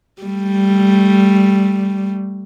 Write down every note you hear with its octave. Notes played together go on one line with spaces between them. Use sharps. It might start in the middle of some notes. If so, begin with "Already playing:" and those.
G3 A3